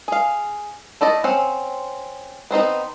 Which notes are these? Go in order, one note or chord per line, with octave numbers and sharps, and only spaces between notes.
G#4 F5
A3 E4 D5 D#5
C4 C#4 F#5
B3 C4 D#4 B4